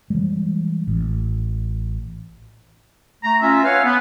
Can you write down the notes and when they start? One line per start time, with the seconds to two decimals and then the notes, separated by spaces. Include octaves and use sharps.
0.10 E3 G3 G#3
0.87 A1
3.23 A3 A#5
3.41 C#4 F4 E5
3.64 B4 C#5 F5 F#5 G#5
3.84 B3